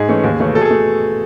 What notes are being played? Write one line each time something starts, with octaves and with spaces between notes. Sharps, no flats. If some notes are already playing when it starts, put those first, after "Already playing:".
Already playing: G#2 G#4
E3 A3 C#4
D#2
C#3 E3 A3 C#4
B2 A4
G#4
A4
A3